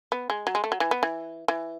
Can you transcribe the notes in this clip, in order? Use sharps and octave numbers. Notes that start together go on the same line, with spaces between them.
B3
G#3
F#3
G#3
A3
F#3
E3
B3
E3
E3